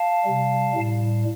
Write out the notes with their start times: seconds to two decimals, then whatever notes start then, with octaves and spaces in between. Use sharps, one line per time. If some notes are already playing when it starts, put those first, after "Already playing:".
Already playing: F5 A5
0.24 C3 G3
0.75 A2 G3